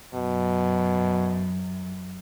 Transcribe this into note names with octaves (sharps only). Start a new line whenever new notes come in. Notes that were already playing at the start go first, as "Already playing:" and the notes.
F#2 B2